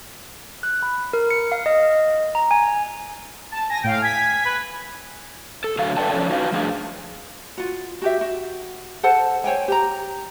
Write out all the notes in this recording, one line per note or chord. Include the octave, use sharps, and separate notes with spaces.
F#6
B5
A#4
C#7
F5
D#5
A#5
G#5
A5
G#5 A#6
A2 F5 G5
G#5 G#6 B6
B4
A4
D3 F#3 A3 F5
A4 B4 C#5 D5 G5 A5
F3 C#4 A4 C#5 D5
D#4 F#4 B4 F5
F3 A3 D4 G#4 D5 F5
F4 F#4
F#4 G4 E5
F#4
A4 C5 F#5 A5
C5 C#5 G5 G#5
G4 A#5